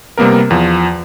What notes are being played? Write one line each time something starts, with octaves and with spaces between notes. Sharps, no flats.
C3 G3 A#3 B3 A#4
E2 F3